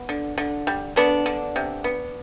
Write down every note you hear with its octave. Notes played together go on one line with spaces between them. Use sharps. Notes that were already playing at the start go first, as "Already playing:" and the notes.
Already playing: B3
D3
D3
G3
D3 B3 D4
D3
C3
B3